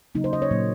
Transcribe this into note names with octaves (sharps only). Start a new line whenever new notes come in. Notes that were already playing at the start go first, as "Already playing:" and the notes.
C#3 F#3 A#3 D#4
C5
D#5
C#5
A#2 F#3 A#3